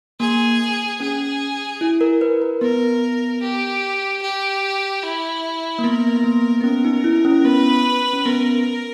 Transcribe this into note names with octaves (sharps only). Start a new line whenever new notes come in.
A#3 G#4
C#4 G#4
E4
A#4
B4
A#4
B3 A#4
G4
G4
E4
A#3
B3 A#4
B3
A#3
B3
C#4 A#4
D#4
E4
C#4
B3 B4
C#4
B3 A#4